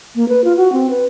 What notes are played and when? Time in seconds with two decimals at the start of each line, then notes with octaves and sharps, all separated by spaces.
0.15 A#3
0.28 B4
0.44 F4
0.57 F#4
0.72 C4
0.90 B4